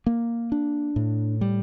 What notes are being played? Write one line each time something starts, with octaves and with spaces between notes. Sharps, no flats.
A#3
D4
A2
G3